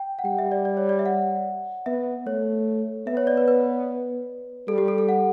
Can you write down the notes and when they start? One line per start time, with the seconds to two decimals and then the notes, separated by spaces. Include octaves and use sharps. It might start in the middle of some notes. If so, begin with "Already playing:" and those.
Already playing: G5
0.19 F#5
0.25 G3 G5
0.38 E5
0.52 D5
0.65 D5
0.77 C#5
0.89 D5
0.99 E5
1.06 F#5
1.86 B3 E5
2.27 A3 C#5
3.07 B3 E5
3.17 C#5
3.27 D5
3.37 B4
3.48 B4
4.68 G3 A4
4.78 G4
4.88 A4
4.98 A4
5.09 F#5